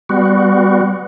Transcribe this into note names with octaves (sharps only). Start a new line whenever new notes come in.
G3 B3 F#4